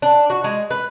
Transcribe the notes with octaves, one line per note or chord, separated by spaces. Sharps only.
D4
F#4
G#3
B4